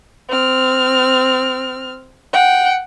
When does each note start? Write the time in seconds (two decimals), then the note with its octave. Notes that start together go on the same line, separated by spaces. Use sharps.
0.29 C4 F6
2.33 F#5 G5